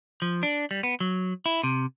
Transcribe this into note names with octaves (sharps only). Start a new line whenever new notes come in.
F3
D4
G3
B3
F#3
E4
C3